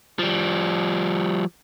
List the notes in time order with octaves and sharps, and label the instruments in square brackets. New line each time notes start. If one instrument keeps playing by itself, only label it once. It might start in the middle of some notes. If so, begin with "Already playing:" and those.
[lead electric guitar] F3 G3